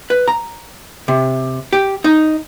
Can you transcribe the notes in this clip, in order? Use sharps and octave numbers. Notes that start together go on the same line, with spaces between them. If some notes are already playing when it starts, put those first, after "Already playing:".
B4
A#5
C3
G4
D#4